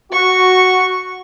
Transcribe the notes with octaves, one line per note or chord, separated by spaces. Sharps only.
F#4 C#6